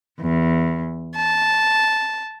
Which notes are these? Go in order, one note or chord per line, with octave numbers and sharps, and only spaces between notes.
E2
A5